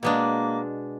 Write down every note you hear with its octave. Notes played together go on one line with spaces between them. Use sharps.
B2 G#3 A#3 D4